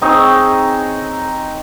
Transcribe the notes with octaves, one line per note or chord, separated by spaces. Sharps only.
C4 D#4 G#4 C#5